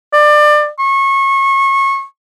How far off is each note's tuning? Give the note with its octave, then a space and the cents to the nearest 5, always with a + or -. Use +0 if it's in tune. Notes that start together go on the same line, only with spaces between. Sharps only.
D5 +25
C#6 -25